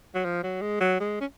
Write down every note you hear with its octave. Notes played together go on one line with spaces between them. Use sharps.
F#3
F3
F#3
G#3
F#3
G#3
C#4